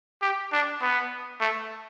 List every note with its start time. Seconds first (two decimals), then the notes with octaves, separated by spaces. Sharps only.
0.22 G4
0.52 D4
0.81 B3
1.40 A3